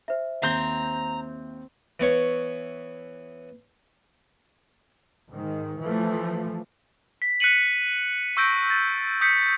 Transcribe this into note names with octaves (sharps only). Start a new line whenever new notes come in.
C5 E5
D#2 C4 A#5 G6 G7
E3 B3 C#5 C#6
G#2 D#3
E3 F3 A3
B6
F#6 B6 C#7 D#7 F#7
C#6 E6 G6 A#6 D7
A6
D#6 G6 B6 C#7